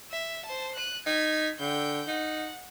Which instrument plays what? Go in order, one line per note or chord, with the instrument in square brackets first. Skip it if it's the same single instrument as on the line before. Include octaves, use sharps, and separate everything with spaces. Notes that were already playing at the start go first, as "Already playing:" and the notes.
[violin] E5
C5 A5
F#6 D#7
[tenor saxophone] D#4 [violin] G#6 B6
[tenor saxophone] D3 [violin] G5 G6
[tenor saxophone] D#4 [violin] F#5